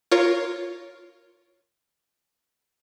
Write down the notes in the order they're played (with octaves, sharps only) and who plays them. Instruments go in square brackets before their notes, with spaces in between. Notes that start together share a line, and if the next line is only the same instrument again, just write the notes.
[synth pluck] F4 A#4 C#5